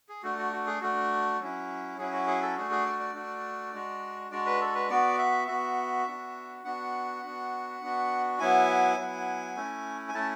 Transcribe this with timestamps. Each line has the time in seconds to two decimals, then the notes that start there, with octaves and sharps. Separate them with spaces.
0.09 G#4
0.23 A3 D4 F#4
0.38 F#4
0.53 F#4
0.67 G#4
0.81 A3 D4 F#4
1.40 F#3 C#4 E4
1.98 F#3 C#4 E4 G#4
2.13 F#4
2.27 G#4
2.42 A4
2.56 A3 D4 F#4 G#4
2.71 G#4
2.86 D5
3.00 D5
3.15 A3 D4 F#4
3.73 G#3 D4 F#4
4.31 G#3 D4 F#4 D5
4.46 B4
4.61 A4
4.75 B4
4.90 B3 F#4 D5
5.19 E5
5.48 B3 F#4 E5
6.06 B3 D4 F#4
6.64 B3 D4 F#4 F#5
7.23 B3 D4 F#4
7.81 B3 D4 F#4
8.39 F#3 B3 E4 G#5
8.97 F#3 B3 E4
9.56 A3 C#4 E4
10.09 G#5
10.14 A3 C#4 E4 A5